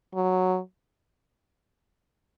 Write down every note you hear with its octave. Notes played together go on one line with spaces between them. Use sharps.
F#3